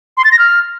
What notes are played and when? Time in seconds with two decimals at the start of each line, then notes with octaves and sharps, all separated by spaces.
0.17 C6
0.24 A6
0.32 A#6
0.39 F6